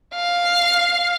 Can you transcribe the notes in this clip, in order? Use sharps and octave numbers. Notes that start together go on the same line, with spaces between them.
F5